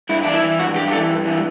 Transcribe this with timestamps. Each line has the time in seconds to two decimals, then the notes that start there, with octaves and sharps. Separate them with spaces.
0.09 G2 E4
0.23 E3 D4
0.34 E4
0.43 E3
0.59 G2 F#4
0.75 G2 G4
0.88 G4
0.92 E3 A4
1.09 G2
1.26 E3